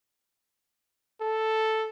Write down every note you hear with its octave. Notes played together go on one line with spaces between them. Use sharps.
A4